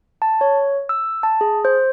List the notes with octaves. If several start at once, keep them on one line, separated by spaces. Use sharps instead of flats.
A5
C#5
E6
A5
G#4
C5